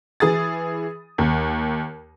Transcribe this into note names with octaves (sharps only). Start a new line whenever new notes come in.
E3 G#4 D#6 A6
D#2